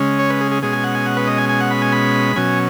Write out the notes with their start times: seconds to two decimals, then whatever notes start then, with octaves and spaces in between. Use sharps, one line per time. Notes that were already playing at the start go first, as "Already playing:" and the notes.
Already playing: C#3 G#3 C#4
0.19 C#5
0.30 B4
0.41 G#4
0.51 G#4
0.62 B2 G#3 C#4 G#4
0.73 G#5
0.84 F#5
0.95 G#5
1.06 F#5
1.17 B4
1.27 D#5
1.38 G#5
1.49 G#5
1.61 F#5
1.71 B5
1.82 G#5
1.92 B5
2.36 B2 F#3 C#4 G#5